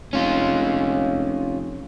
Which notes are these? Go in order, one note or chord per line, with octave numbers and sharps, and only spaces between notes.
F1 C#4 F4